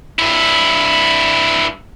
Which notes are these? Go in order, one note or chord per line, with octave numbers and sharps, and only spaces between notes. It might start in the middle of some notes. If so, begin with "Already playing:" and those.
G2 E4